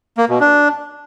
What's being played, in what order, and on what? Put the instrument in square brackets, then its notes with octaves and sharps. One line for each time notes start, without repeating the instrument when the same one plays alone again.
[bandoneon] A#3
B2
D4